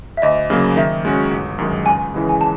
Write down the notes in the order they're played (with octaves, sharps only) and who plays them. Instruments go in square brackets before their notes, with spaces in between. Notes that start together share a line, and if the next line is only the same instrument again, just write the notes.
[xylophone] E5
[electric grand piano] D2 [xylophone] D#5
[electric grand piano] C#3 F#3 A#3
[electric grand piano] D#3 [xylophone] E5
[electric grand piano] G#3 C#4 F#4
G1
F#2 D#3 G#3
[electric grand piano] C#2 [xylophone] G#5
[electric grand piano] C#3 E3 G#3
[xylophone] G#5
A5